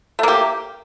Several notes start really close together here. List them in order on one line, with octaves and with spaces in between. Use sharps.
A3 A#3 G4